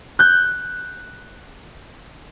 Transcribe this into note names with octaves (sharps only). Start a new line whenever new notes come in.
F#6 G6